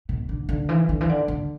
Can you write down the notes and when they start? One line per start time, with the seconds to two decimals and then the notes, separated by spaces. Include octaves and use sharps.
0.09 B2
0.29 D3
0.49 D3
0.69 E3
0.89 D3
1.01 E3
1.09 D3
1.28 D3